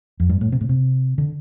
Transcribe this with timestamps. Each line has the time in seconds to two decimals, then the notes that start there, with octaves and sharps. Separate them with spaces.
0.20 F2
0.29 G2
0.41 A2
0.52 C3
0.61 A2
0.69 C3
1.18 D3